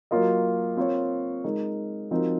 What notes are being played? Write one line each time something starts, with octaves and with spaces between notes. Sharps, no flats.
F#3 A#3 F4 A#4 D#5
C4 F4 A#4 C#5
G#3 D#4 A#4
F3 C4 D#4 F#4 A#4